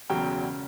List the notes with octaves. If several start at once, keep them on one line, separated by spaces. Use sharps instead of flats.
E1 E2 C#3 F#3 G5
C#3